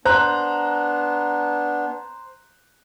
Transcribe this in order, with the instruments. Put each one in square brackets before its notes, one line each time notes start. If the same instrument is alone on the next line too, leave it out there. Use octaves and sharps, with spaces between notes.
[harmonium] B3 D4 [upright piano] C5 A#5 F#6